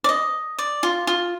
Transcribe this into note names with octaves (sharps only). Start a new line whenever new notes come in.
D5
D#5
D5
F4
F4